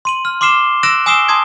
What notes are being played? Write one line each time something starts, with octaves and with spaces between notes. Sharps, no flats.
C6 D#7 F#7
F6
C6 D6 F6 C7 E7 G7
E6 F#6 A#6 D7 E7 F#7
G#5 D#6 E6 C7 E7 G7
A5 C6 D#6 G#6